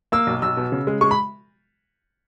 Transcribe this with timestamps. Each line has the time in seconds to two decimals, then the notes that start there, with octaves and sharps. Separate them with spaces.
0.12 A#3 E6
0.27 B1
0.42 B1 E6
0.57 B2
0.72 C#3
0.87 G#3
1.01 G#3 C#6
1.11 B5